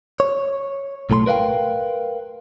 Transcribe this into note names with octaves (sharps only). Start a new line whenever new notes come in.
C#5
B1 A2 A3 A#5 C6
A#4 B4 E5 F5 G5